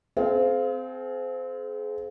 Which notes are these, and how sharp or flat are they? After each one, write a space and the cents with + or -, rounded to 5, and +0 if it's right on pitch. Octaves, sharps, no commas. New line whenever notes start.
C4 -20 G#4 +40 F5 +0